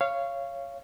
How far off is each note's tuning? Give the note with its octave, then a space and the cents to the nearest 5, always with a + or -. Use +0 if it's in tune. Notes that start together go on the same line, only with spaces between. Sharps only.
C#5 +0 F5 -20